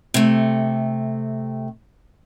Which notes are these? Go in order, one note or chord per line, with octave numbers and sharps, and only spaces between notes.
C3 A3